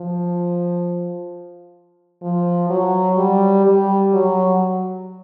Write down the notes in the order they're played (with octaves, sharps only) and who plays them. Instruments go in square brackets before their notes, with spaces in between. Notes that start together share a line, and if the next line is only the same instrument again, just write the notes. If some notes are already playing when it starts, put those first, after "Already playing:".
Already playing: [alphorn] F3
F3
F#3
G3
G3
F#3